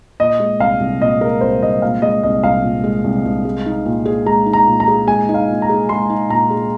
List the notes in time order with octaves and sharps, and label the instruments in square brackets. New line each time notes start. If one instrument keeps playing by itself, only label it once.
[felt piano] A#2 [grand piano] D#5
[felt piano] G#3
[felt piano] C2 [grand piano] F5
[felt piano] C2
[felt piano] A#2 [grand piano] D#5
[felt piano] G#3 [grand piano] A#4
[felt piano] C2 [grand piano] C5
[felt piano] C2 [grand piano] D#5
[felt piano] A#2 [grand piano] F5
[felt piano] G#3 [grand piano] D#5
[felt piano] C2 [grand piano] D#5
[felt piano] C2 [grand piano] F5
[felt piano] A#2
G#3
C2
C2
G#3
D#4
A#2
G#4
[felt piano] G#3 [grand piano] A#5
[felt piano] D#4
[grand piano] A#5
[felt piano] A#2
[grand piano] A#5
[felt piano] G#4
[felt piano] G#3 [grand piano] G#5
[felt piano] D#4
[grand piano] F5
[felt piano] A#2
[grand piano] A#5
[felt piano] G#4
[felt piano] G#3 [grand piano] C6
[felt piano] D#4
[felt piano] A#2 [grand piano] A#5
[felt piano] G#4